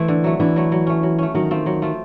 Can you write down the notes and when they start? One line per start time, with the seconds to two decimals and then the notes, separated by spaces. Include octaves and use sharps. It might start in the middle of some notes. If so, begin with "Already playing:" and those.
Already playing: E3 A3 C4
0.08 D3
0.24 F#3 A3
0.40 D3 E3
0.56 F#3 A3
0.72 F#3
0.87 A3 C#4
1.03 F#3
1.18 A3 C#4
1.34 D#3 F#3
1.51 A3 C4 F4
1.66 F#3
1.82 A3 C4 F4